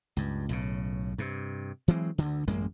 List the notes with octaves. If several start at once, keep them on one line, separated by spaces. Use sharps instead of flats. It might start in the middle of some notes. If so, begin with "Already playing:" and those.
C#2 G2
B1 A2 C#3
G2 C3
E3 F#3 G#3 C4
D2 D3
A1 F#2 G#3 A#3